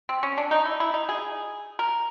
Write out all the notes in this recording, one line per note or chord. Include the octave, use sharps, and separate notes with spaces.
C4
C#4
D4
D#4
E4
E4
D#4
G#4
A#4